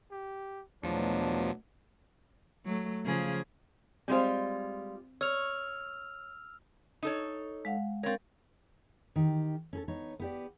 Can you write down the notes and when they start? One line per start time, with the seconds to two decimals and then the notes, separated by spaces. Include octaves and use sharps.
0.12 G4
0.83 E2 B2 F3 F#3 A3 D4
2.66 F#3 A3
3.05 C#3 F3 G#4
4.08 G3 G#3 C4 F4 C5
5.21 C#5 E6 F6 F7
7.03 D#4 A4 C#5
7.65 G#3 F5 F#5
8.03 C4 A#4 C#5 F5 A6
9.16 D#3 G4
9.73 C#4 G#4 A4
9.88 B3 D#4 C#5
10.19 B3 G4 D5